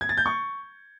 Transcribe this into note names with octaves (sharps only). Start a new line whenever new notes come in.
G#6
A6
G6
C#6